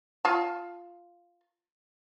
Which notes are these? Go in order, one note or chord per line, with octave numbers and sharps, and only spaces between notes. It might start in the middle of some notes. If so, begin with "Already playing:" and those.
F4 A5